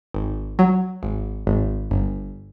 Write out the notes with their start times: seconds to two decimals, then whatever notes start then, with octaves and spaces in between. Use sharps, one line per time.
0.14 G#1
0.59 F#3
1.03 G#1
1.47 G#1
1.91 G1